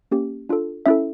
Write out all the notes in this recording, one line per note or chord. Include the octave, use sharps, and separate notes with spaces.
A#3 C#4 G4
D4 F4 A4
C#4 E4 A4 E5